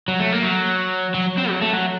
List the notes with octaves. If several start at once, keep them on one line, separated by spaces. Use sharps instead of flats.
F#3
A3
A#3
F#3
F#3
C4
F#3
A3
F#3